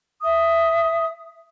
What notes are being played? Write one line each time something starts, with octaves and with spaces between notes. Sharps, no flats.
E5 D#6